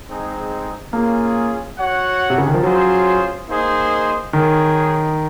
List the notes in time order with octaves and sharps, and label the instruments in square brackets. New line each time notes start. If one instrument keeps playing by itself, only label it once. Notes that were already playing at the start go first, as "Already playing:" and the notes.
[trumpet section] G#3 C4 D#4 G#4
[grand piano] A#3 [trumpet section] C#4 F4 G#4
[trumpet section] F#4 C#5 F#5
[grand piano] C3
C#3
D#3
F3
[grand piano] F#3 [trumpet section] C#4 F4 G#4 C5
[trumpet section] A#3 D#4 G#4 C5 D#5
[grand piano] D#3 [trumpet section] D#4 G#4 C#5